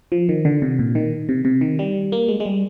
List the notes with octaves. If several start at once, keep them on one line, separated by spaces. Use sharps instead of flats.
F3
D#3
D3
C3
A#2
D#3
C3
C3
D#3
G3
A#3
G#3
G#3
G3